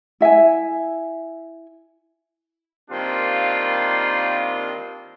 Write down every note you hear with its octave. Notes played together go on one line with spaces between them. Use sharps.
E4 E5 F#5 G#5
D#3 G3 A#3 C4 D4 F4